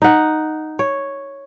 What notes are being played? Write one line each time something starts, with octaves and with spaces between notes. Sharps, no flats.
D#4 F#5
C#5